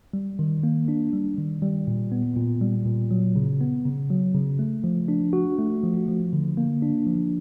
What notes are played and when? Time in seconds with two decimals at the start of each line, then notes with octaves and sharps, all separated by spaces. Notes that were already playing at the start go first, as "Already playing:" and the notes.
0.13 G3
0.39 D#3
0.64 A#3
0.88 D4
1.13 G3
1.38 D#3
1.62 G3
1.87 A#2
2.12 B3
2.37 A#2
2.61 G3
2.86 A#2
3.11 F#3
3.36 C#3
3.61 B3
3.85 C#3
4.10 F#3
4.34 C#3
4.59 A3
4.84 F3
5.08 D4
5.33 F#4
5.58 A3
5.84 F3
6.08 F3
6.33 D3
6.57 A#3
6.82 D4
7.07 F3